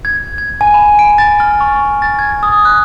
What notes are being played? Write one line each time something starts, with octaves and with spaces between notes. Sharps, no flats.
G#6
G#6
G#5
B5
D7
A6
F6
C#6
A6
G#6
D#6
F#6